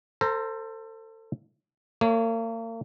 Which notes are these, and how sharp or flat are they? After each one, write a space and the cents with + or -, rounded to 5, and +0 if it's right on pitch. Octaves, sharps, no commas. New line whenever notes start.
A4 +30 C5 +0 A#5 +0
A#3 -40 C#5 +0